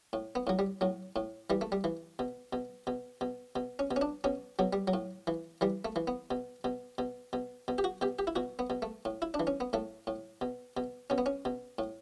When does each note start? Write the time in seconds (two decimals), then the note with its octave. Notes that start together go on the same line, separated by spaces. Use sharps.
0.13 A2
0.35 B3
0.47 A2 F#3
0.59 G3
0.81 A2 F#3
1.16 A2
1.50 E3 G3
1.61 A3
1.72 G3
1.84 E3
2.19 B2
2.53 B2
2.87 B2
3.21 B2
3.56 B2
3.79 C#4
3.91 B2
3.96 C#4
4.01 D4
4.24 B2 C#4
4.59 B2 F#3
4.73 G3
4.88 F#3
4.94 A2
5.27 E3
5.61 E3 G3
5.85 A3
5.96 E3
6.07 B3
6.31 B2
6.64 B2
6.98 B2
7.33 B2
7.68 B2
7.78 G4
7.84 F#4
8.01 B2 G4
8.19 G4
8.27 E4
8.36 B2 F#4
8.59 B3
8.70 B2
8.82 A3
9.05 A2
9.22 E4
9.34 D4
9.40 E3
9.47 C#4
9.60 B3
9.73 A2 A3
10.07 A2
10.41 B2
10.77 B2
11.10 B2 C#4
11.18 B3
11.26 C#4
11.45 B2
11.79 A2